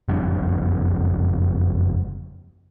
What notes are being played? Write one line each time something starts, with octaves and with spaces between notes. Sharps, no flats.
F#1 F2 G3 D4